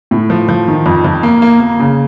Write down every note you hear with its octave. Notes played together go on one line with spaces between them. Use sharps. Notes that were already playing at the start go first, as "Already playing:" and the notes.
A2
F3
F3
D#3
F2
F2
A#3
A#3
A#3
C#3